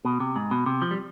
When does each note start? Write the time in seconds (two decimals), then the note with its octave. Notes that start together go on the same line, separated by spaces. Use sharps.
0.05 B2
0.20 C3
0.36 G#2
0.51 B2
0.66 C3
0.82 F3
0.91 G3